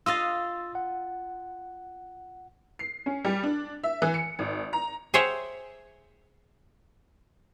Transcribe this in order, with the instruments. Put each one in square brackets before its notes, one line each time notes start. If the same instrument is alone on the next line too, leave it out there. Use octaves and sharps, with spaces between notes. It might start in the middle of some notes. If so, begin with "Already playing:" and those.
[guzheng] F4 D#5 F5 [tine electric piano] E6 A6
[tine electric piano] F#5
[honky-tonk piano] C7
C#4
G3
D4
E5
E3
C#7
G#1
A#5
[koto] G#4 C5 C#5 E5 F#5 G5